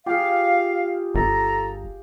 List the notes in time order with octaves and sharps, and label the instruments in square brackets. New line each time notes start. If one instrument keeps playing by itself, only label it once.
[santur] F4 G#4 [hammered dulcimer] G4 [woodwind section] F5
[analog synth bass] G1 [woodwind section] A4 A#5